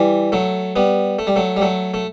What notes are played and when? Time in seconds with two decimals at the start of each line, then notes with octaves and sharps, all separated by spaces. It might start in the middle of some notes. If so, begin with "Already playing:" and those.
Already playing: E3 G3
0.32 F#3 A3
0.76 G3 B3
1.19 A3
1.27 G3
1.36 F#3 A3
1.57 G3
1.61 F#3 A3
1.94 A3